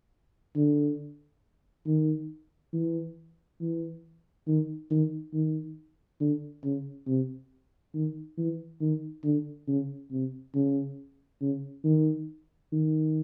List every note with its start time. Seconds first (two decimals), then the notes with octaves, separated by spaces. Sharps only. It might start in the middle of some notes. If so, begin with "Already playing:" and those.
0.56 D3
1.86 D#3
2.73 E3
3.60 E3
4.47 D#3
4.91 D#3
5.33 D#3
6.20 D3
6.64 C#3
7.07 C3
7.94 D#3
8.37 E3
8.81 D#3
9.24 D3
9.68 C#3
10.11 C3
10.55 C#3
11.41 C#3
11.85 D#3
12.72 D#3